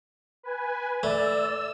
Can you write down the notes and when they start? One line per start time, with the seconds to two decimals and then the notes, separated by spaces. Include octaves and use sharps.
0.43 B4 G#5
1.03 A3 D5 E6